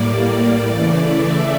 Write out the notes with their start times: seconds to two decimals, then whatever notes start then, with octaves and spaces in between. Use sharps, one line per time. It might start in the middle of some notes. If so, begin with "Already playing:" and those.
Already playing: A2 G3 A#3 D5
0.16 D5
0.68 C#3 E3 A3 D5
1.21 E5